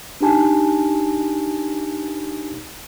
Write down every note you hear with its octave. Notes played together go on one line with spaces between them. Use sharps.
D4 D#4 G4 G#5 A5